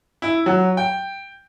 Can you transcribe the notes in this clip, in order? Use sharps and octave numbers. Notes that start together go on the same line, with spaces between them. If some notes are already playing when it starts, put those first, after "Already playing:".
E4
F#3
G5